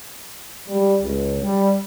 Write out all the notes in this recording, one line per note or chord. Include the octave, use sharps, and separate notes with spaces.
G3
C#2
G3